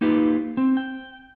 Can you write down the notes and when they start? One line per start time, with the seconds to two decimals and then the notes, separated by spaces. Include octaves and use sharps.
0.01 A#3 D#4 F4 G4 B4
0.57 C4
0.77 G5